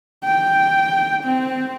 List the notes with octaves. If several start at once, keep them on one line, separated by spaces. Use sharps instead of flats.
G5
C4